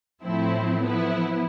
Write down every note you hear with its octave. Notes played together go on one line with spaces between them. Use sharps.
A2 F3 C4 E4
F3 B3 E4